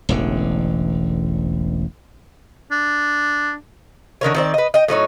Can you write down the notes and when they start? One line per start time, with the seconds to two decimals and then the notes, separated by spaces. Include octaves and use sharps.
0.09 E1 A1 D3
2.71 D4
4.21 D3 D#3 A#4 C#5
4.35 D#3 C4 D5
4.54 B4 D#5
4.74 D#5 G5
4.88 A2 F#3 D#4 C#5